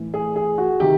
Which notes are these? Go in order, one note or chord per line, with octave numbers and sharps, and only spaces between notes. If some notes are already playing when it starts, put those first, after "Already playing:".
Already playing: A2 E3
G#4
G#4
F#4
C3 D#3 G4